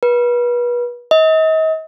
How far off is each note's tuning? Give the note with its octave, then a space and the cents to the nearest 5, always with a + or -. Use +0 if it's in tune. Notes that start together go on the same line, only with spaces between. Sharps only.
B4 -35
D#5 +40